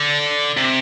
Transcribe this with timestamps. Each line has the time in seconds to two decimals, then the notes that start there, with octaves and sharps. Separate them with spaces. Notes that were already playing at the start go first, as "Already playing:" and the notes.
Already playing: D3
0.57 C3